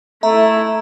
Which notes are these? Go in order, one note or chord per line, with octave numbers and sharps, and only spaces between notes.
A3 E4 E5 A#5